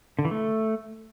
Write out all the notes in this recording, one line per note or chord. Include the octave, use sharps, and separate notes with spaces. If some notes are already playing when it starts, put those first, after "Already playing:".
D3
E3
A3